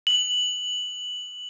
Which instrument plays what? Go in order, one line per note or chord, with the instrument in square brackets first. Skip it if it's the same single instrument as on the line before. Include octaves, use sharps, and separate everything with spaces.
[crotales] F#7